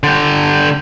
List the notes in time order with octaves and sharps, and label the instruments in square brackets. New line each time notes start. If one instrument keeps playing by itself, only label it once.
[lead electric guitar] D3 G4